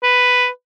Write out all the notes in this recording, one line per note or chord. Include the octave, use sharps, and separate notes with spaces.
B4